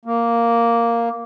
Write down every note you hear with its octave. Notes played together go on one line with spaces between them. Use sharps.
A#3